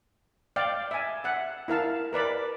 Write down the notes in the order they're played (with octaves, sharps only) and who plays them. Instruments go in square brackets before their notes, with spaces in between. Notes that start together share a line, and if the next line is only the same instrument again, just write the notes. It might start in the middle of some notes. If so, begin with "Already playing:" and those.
[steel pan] D5 F5 G5
E5 G#5
E5 F#5
E4 A#4 F5 A5
A#4 B4 D5 B5